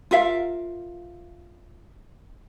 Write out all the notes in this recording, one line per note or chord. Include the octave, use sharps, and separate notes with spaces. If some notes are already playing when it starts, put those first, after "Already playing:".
F4 A#4 E5 F5